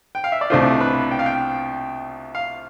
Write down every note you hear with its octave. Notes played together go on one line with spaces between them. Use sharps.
G5
F5
E5
D5
C2 B2 A3 D4 F4 C5
B4
G5
F5
G5
F5